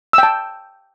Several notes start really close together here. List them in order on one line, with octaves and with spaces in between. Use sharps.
E6 G5 A5